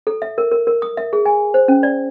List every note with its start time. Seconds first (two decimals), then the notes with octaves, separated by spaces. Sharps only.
0.07 A4
0.22 E5
0.38 A#4
0.52 A#4
0.67 A#4
0.82 D#6
0.97 E5
1.13 G#4
1.26 G#5
1.54 C5
1.68 C#4
1.83 D5